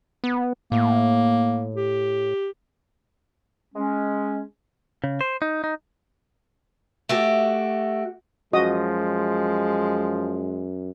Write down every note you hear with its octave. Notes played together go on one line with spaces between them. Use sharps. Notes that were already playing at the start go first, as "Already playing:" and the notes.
B3
A2 A#3
G4
G#3 C#4
C#3
C5
D#4
D#4
A3 F#4 G4
F#2 F3 G#3 F#4 D#5 D#6